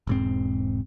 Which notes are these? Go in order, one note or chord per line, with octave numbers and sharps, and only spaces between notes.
E1 G#2 C4